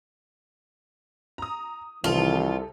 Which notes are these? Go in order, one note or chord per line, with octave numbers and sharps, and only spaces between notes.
A#5 D#6
C2 C3 D#3 E3 F4 A4 F7